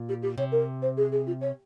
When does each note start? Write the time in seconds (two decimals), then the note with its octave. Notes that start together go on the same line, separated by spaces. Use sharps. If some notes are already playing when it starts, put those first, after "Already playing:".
Already playing: A#2
0.08 G4
0.22 G4
0.37 C3 C#5
0.51 A#4
0.82 C5
0.97 G#4
1.11 G#4
1.26 F4
1.41 C#5